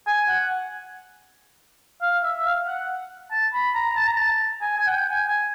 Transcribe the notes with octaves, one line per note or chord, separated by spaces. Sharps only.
G#5
F#5
F5
E5
F5
F#5
A5
B5
A#5
A5
A#5
A5
G#5
G#5
F#5
G5
G#5
G#5